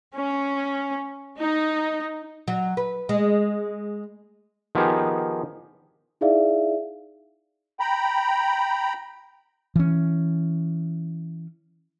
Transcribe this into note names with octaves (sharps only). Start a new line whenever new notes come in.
C#4
D#4
F#3
B4
G#3
D#3 F3 B3 D#4 G4 G#4
D#4 E4 G#4 D5 E5 F5
G5 A#5 B5
E3 C#4